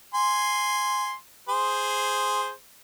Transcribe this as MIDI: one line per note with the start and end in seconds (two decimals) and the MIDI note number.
0.14 1.13 80
0.14 1.13 84
1.49 2.51 68
1.49 2.51 72